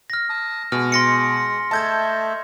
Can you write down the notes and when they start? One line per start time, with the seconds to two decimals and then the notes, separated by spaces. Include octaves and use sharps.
0.10 F6 A#6
0.29 A5 D#6
0.72 B2 G#3 F6
0.92 C6 A#6 C#7
1.71 A3 D#5 E5 A5 G6 G#6